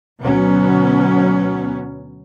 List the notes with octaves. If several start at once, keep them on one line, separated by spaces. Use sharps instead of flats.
D2 B2 F#3 B3 C#4